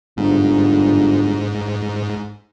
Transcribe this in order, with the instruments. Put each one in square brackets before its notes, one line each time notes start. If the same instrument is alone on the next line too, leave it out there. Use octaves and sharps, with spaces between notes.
[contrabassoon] G1 [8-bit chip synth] G#2